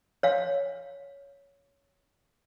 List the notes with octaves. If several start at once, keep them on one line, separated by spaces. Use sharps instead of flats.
C#5 F5